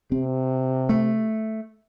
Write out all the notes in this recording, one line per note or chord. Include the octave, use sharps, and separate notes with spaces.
C3 C4
A3